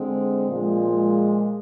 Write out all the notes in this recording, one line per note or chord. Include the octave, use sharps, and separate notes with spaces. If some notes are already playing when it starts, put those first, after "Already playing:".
Already playing: D3 G#3 C4
A#2 F3 G#3